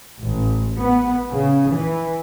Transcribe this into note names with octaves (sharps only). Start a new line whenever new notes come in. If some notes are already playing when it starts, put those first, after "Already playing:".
A1
B3
C#3
E3